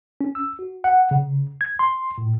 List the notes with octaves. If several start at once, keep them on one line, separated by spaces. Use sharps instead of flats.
C#4
E6
F#4
F#5
C#3
G#6
C6
A2